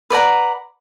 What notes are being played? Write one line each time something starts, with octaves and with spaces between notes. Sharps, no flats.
B4 D5 F#5 A#5